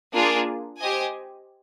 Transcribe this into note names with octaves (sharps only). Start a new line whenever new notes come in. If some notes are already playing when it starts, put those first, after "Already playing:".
A#3 D4 F4 G#4
G4 C5 D#5 G#5